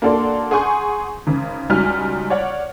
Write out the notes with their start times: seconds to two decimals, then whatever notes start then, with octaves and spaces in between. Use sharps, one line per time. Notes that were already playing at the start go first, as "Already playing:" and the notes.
0.02 A#3 D4 F#4 A4 D5 C6
0.51 G#4 F#5 G#5 C6 C#6 G6
1.27 G#1 C#3
1.69 C#2 F#3 G3 D#4 G#5 F6
2.30 C#5 D5 F#5